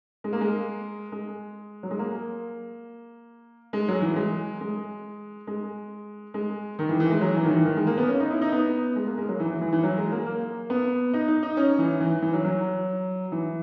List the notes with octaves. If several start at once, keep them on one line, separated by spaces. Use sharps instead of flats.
G#3
A#3
G#3
G#3
F#3
G#3
A#3
G#3
F#3
E3
G#3
G#3
G#3
G#3
D#3
E3
E3
G#3
F#3
E3
D#3
E3
D#3
G#3
A#3
B3
C#4
D#4
E4
D#4
B3
G#3
A#3
G#3
F#3
E3
E3
E3
E3
F#3
G#3
A#3
A#3
B3
D#4
D#4
D#4
C#4
E3
E3
E3
F#3
F#3
E3